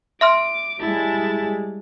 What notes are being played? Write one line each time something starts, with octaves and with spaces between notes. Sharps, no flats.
E5 C6 D6 F6
G3 G#3 E4 A5